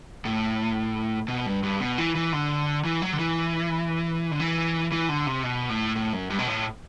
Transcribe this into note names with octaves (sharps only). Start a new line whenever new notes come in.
A2
B2
G2
G2
B2
E3
E3
D3
E3
F#3
D3
E3
D3
E3
E3
D3
C3
B2
A2
A2
F#2
G2
B2
A2